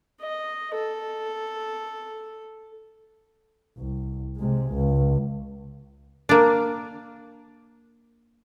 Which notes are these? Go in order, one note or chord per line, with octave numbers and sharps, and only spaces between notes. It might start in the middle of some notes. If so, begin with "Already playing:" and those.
D#5
A4
C2
C3 G#3
C#2
A#3 D4